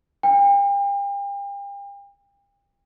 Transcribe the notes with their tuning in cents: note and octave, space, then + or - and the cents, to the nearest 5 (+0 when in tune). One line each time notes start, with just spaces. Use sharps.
G5 +40